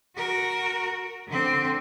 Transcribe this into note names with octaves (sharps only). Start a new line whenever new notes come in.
F#4 A#4
D3 C4